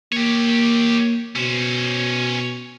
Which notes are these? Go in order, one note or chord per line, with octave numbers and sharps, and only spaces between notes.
A#3 G4 C#5
B2 C#4 C5